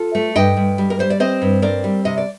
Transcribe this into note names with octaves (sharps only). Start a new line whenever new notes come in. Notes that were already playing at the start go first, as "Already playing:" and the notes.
Already playing: F4 A4
A3
G2 D#5 G5
G2
G3
A#4
G3 C5
D5
C4 C5 D#5
G2
C4 A#4 D5
G3
C3 D#5
D5